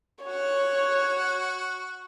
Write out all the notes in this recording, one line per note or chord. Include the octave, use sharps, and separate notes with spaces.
F#4 C#5